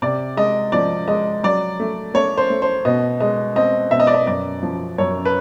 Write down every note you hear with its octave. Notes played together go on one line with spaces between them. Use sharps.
C3 D5
G#3 D#5
F3 D5
G#3 D#5
F#3 D5
A3
A3 C#5
C5
A3
C5
B2 D#5
G#3 D#5
C4 D#5
B2 E5
D#5
D5
D#5
F#2 D5
F3
F#2 C#5
B4